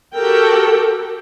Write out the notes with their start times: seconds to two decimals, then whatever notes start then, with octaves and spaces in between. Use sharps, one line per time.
0.15 F#4 G4 A4 A#4 G5